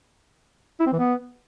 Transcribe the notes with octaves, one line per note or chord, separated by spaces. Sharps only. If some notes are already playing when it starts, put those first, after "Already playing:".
E4
C4
E3
B3